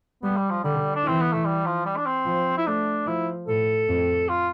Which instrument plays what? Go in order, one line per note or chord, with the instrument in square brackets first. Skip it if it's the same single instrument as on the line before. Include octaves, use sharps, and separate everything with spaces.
[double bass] G3 [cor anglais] B3
[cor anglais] G3
F3
[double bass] D3 [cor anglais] G3
[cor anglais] D4
[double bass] E3 [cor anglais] C4
[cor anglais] B3
A3
G3
F3
G3
D4
C4
[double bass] F3
[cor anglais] E4
[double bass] A3 [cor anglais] D4
[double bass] F3 [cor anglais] E4
[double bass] A2 [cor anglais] A4
[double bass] F2
[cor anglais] F4